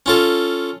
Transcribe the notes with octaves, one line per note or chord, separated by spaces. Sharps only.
C#4 F4 A4